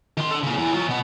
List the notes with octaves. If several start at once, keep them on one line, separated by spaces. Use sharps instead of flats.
D#3 C6
D4 A4
A#2 C#3
E2 E3
F#3 F4
B2 B3